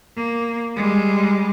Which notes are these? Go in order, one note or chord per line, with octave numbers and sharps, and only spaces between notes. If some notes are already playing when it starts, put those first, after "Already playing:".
A#3
G3 G#3